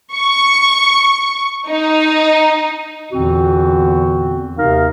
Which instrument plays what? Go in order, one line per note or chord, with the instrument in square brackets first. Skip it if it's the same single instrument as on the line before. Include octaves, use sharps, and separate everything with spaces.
[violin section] C#6
D#4
[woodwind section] E2 A#2 D3 E3 C4 F#4
D#2 C3 D#4 A#4 F5